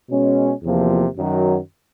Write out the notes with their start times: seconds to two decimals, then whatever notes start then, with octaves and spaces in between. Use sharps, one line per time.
0.10 B2 G#3 C#4
0.63 E2 C3 F3 A#3
1.17 F#2 D#3 F#3